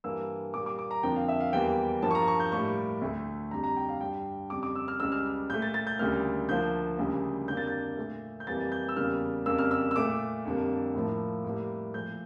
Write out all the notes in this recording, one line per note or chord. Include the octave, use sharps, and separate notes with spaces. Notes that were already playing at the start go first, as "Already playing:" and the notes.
G2 E3 G3 A#3 E6
A#2 G3 A#3 D6
D6
D6
A#5
F2 D3 F3 A#3 G5
F5
E5
F5
E2 E3 G3 A#3 G5
G2 F3 A#3 A5
C#6
A#5
C#6
G6
A2 G3 A#3 C#6
D2 D3 A3
F2 D3 G3 A#5
A#5
G5
F5
G2 D3 G3 G5
F2 C#3 G3 D6
D6
E6
F6
C#2 C#3 G3 E6
F6
A#2 A3 G6
A6
A6
G6
D2 C#3 G3 A#3 F6
D2 D3 F3 A#3 G6
D2 C#3 G3 A#3
F2 D3 G3 A#3 G6
A6
G6
A#2 A3
G6
F2 E3 G3 A#3 A6
G6
E6
E2 C#3 G3 A#3 F6
F2 C#3 G3 A#3 E6
F6
E6
E6
A#2 A3 D6
F2 D3 G3 A#3
A2 F3 A#3
A2 G3 A#3
A#2 F3 A3 G6